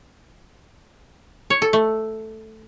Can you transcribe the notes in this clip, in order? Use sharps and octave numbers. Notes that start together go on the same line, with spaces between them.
C#5
A4
A3